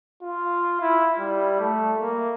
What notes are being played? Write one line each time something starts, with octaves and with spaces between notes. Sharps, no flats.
F4
E4
G3
A3
A#3